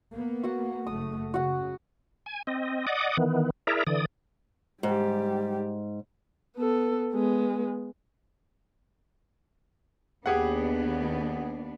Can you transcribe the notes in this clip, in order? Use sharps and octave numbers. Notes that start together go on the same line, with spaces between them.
A#3 B3
F#4 F#5
F#1 A3 D#6
C#3 F#4 F#5
G#5
C4 D#5
D5 D#5 F#5 D6 D#6
D#3 E3 B3
E4 G#4 A#4 D5 E5 A#5
D3 E3 D5 D#6
G#2 G3 G4
B3 A4
G#3 B3
D#2 B3 D4 G4 G#4 F#5